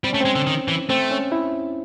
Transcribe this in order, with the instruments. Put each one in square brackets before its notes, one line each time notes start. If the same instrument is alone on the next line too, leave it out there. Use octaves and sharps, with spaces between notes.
[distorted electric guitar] G3 [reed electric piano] C4
[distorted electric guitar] A3 [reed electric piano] C#4
[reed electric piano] C4
[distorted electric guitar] G#3
D3
D#3
E3
[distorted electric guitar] A3 [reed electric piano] C4
[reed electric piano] C#4
E4